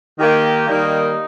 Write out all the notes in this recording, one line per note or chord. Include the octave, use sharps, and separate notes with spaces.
D#3 A#3 G4
D#3 G3 A#3 D#4